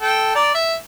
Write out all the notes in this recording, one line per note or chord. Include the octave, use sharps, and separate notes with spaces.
A4 G5
D5 A#5
E5